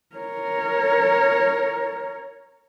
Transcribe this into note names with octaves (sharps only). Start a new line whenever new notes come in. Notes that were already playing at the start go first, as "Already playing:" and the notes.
A#4 C#5